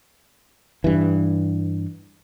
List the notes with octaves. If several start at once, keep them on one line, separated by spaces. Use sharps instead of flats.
G2 E3